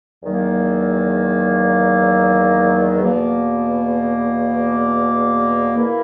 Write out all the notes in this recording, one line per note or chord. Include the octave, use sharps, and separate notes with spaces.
E2 D#3 F#3 A#3
E2 B2 A#3
E3 A#3 E4 A#4